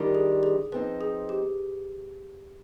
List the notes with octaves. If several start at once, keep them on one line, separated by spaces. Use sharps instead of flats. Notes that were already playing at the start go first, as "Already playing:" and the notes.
Already playing: D#3 G3 D4 F4
G#4
G#4
F3 C4 D#4 B4
G#4
G4